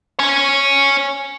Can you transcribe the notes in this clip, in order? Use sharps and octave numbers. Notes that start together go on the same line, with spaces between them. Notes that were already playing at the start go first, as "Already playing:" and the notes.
C#5 G#5